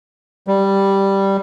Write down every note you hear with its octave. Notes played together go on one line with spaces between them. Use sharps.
G3